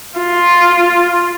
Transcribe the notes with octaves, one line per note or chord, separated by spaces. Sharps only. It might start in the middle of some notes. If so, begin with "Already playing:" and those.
F4